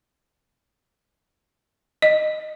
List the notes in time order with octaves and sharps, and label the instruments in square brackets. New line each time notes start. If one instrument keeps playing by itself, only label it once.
[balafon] D#5